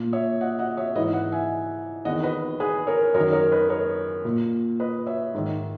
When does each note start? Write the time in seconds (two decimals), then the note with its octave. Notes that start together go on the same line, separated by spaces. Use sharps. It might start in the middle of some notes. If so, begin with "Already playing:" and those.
Already playing: A#2
0.13 C#5 E5
0.41 D#5 F#5
0.59 D#5 F#5
0.77 C#5 E5
0.95 G#2 E3 B4 D#5
1.13 D#5 F#5
1.32 E5 G#5
2.05 E2 D#5 F#5
2.09 D#3
2.23 B4 D#5
2.60 G#4 B4
2.87 A#4 C#5
3.14 F#2 A#4 C#5
3.18 D#3
3.32 A#4 C#5
3.52 B4 D#5
3.69 A#4 C#5
4.25 A#2
4.80 B4 D#5
5.06 C#5 E5
5.34 G#2 D#3